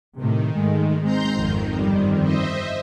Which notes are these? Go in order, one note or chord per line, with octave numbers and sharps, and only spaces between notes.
A2 C3 D#3
G#2 G#3 A3
G#3 C4 A#5 C6 G6
G#1 F2 D#3
G1 G3 C4
C5 D#5 E5